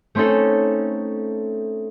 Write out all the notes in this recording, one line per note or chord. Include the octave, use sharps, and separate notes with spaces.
A3 C4 C#4 D#4 A4